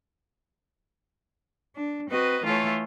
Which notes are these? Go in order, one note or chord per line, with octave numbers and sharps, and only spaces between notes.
D4
C4 F#4 B4 D#5
E3 A3 F4 A4 C#5